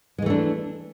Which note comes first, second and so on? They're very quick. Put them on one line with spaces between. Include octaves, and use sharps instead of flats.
G#3 E3 A3 D4